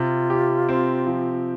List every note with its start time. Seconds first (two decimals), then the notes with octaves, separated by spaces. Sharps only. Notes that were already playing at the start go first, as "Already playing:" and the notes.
Already playing: C3 F4
0.30 G4
0.69 C4
1.06 F3